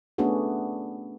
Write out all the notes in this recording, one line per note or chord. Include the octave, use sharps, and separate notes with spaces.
A3 B3 C#4 D4 F#4 G#4